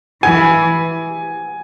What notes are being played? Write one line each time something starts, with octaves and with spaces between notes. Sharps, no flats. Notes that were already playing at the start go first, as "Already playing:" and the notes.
E3 G#5